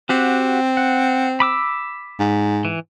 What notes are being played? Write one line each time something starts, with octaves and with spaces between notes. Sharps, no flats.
C4 F#4 G4 F#5
F#5
B5 D6 E6
G#2
E3